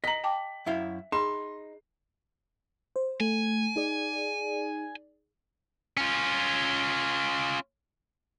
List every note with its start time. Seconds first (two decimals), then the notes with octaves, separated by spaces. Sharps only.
0.04 D#5 A#5 B6 F#7
0.24 G5 A5 D6
0.66 F#2 E4 E5 F5
1.12 D#4 G#4 D#5 B5 C6
2.96 C5
3.20 A3 G#5
3.76 D#4 G#4 D5
5.97 C#4 F4